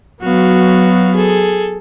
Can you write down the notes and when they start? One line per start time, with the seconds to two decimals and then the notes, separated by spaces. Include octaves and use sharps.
0.22 F#3 B3 F#4 F5
1.15 G#4 A4